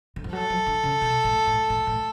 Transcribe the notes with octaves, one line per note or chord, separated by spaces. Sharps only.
D3
F3
F#3 A4
F3
D3
C#3
B2
A2
A2
A2
A2